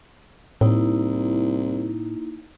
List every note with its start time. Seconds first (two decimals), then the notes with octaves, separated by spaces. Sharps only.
0.61 C2 A2 A#3 D#4 E4